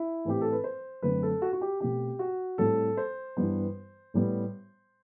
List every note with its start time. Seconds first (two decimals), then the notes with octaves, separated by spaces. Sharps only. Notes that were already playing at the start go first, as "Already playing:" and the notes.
Already playing: E4
0.25 A2 E3 A3 C4 G4
0.41 A4
0.52 B4
0.64 C5
1.02 F#2 D3 A3 C4 B4
1.23 A4
1.42 F#4
1.53 F#4
1.61 G4
1.80 B2 A3 C4 G4
2.19 F#4
2.58 A2 G3 C4 A4
2.97 C5
3.37 G2 E3 G3 B3
4.14 A2 G3 B3